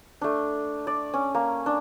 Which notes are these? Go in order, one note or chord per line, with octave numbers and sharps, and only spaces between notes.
A3 D4
D5
C#4
A#3
D4